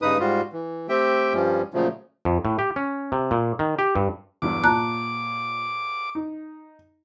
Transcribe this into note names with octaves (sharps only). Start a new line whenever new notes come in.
G2 C#3 D#4 B4 D#6
G#2 G3 F4 F#4
E3
A3 C4 G4 E5 G5
G2 F3 G3 C#4
A#2 C#3 F3 F#3 A3
F2
A2
G4
C#4
C3
A#2
D#3
G4
G2
E2 G2 F#3 D6
A#2 A5 A#5 F#6
D#4